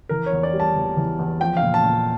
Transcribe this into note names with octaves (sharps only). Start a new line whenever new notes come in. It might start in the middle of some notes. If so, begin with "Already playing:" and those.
E3 A#4
C#5
E2
D5
G3
A5
E2
E3
E2
F3 G5
F5
A#2
A5
A#2